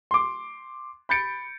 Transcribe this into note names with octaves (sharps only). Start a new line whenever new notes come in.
C6 D6
B5 G6 A6 C#7 D7